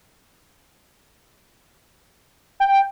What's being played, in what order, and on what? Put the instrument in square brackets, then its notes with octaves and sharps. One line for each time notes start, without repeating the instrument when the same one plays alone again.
[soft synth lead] G5